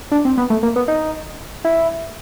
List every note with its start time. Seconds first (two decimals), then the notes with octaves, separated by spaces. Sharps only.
0.12 D4
0.25 C4
0.37 B3
0.50 A3
0.63 A#3
0.76 B3
0.88 D#4
1.65 E4